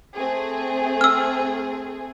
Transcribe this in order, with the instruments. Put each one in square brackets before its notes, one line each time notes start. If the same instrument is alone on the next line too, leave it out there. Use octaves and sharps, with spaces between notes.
[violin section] A3 C4 G#4
[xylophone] E6 F6